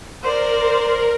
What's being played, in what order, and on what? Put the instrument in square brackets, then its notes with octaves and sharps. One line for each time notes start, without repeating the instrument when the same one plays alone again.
[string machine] A#4 [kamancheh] C5 D5